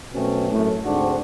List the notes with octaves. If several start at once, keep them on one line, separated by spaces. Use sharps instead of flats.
F#2 B2 A3 C4 C#4
F#2 A2 A3
D2 G#2 C4 D4 F#4